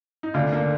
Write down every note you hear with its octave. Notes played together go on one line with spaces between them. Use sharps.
D#4
D2 D4 F4
A#3 D4
D3